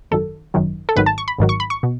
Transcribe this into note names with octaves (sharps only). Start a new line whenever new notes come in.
G#1 F#2 D#3 F#3 A4
G#1 F#2 D#3 F#3
A4
G#1 G#2 D#3 F#3 B4
A5
C#6
B5
G#1 G#2 D#3 F#3
C#6
B5
C#6
B2